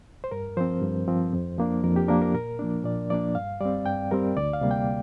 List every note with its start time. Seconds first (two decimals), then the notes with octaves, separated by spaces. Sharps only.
0.24 C5
0.31 G2 A#4
0.57 F3 C4 C5
0.82 G2
1.08 F3 C4
1.33 F2
1.58 F3 A#3 D4
1.83 F2 A#4
1.96 G4
2.08 F3 A#3 D4 A#4
2.22 A#4
2.34 A#2 A#4
2.59 F3 A#3 D4
2.84 A#2 D5
3.10 F3 A#3 D4 D5
3.35 G2 F5
3.61 G3 C4 D5
3.86 G2 G5
4.11 G3 C4 A#4
4.36 D2 D5
4.53 F5
4.61 C3 G3 A#3
4.71 G5